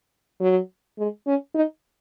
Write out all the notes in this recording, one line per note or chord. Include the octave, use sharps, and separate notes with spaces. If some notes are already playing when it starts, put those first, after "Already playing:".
F#3
G#3
C#4
D#4